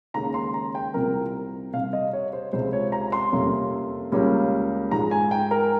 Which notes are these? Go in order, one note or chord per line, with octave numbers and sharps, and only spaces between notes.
D#2 C#3 G#3 C#4 A#5
C6
A#5
G5
C2 C3 F3 C4 A#4
C3 G3 C4 F5
D#5
C#5
C5
C#2 C3 F3 G#3 C5
C#5
A#5
C6
F2 C3 G3 A#3 C#4
C#2 C#3 G3 A#3 C#4
G#2 F3 G#3 A#5
G#5
G5
A#4